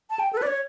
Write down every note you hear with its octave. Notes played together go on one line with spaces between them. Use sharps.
A5
G5
A4
B4
D5
C#5